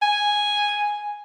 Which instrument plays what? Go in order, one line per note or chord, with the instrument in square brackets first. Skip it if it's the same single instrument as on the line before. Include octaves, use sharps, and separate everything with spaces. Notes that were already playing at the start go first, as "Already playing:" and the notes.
[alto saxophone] G#5